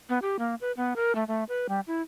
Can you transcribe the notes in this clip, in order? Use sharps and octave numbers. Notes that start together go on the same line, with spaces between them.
B3
G4
A#3
B4
B3
A#4
A3
A3
B4
G3
E4